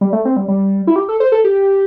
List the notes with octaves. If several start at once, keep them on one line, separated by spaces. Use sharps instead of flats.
G3
A3
C4
G3
G3
E4
G4
A4
C5
A4
G4